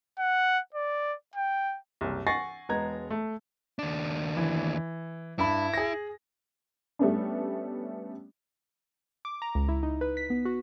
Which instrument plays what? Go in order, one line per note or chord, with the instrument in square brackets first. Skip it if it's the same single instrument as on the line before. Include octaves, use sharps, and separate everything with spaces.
[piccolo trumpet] F#5
D5
G5
[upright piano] F#1 C2
F#5 G#5 C#6 A6 A#6 C7
E1 G#3 B3 A#5 G#6
A3
[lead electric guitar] D#2 D4
[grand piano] E3
[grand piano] G2 B5 [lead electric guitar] E4
[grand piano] G#4 A#6
[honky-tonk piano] G3 A3 B3 C#4 D4
[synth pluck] D6
A#5
C#2
E4
D#4
B4
B6
B3
F#4